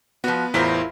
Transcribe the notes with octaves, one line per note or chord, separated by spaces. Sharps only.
F3 B3 F#4 B4
A1 E2 E4 F4 A#4 C5